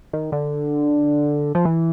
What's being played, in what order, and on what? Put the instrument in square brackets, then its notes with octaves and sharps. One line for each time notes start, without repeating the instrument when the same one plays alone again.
[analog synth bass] D#3
D3
F3
E3